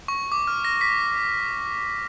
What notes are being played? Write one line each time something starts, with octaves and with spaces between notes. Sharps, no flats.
C#6
D6
F6
A#6
B6